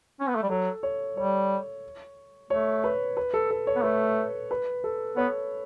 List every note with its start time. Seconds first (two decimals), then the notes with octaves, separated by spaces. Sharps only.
0.20 C#4
0.28 B3
0.35 A3
0.43 G3
0.49 F#3 A4
0.83 C#5
1.17 G3 C#5
2.50 A3 C#5
2.84 B4
3.17 B4
3.34 A4
3.51 A4
3.67 C#5
3.76 B3
3.84 A3 B4
4.51 B4
4.84 A4
5.17 B3 C#5